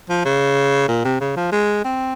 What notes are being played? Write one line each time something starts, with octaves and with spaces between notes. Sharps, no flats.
F3
C#3
A#2
C3
C#3
F3
G#3
C4